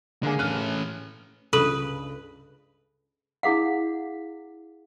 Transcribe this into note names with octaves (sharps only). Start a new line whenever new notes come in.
D3 G#3 A#3 G#4
A2 C#4 F6 F#6
C#2 G2 A4 B4
D4 E4 G#4 F5 F#5